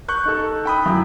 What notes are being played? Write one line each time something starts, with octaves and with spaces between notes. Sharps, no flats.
C#6 F#6 G6
D#4 A4
G5 B5 D#6
F#2 E4